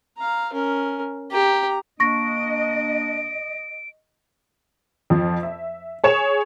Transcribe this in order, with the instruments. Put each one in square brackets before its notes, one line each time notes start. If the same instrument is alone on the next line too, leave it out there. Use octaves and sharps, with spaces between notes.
[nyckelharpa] F5 A#5
C#4 A#4
[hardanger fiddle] G4 [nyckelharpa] A#5
[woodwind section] A#3 D4 [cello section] D#5 [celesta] C#6 A#6 [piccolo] D7
[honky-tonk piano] F2 F3
E5
G#4 C#5 E7